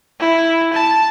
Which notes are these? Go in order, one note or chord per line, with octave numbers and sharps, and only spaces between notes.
E4
A5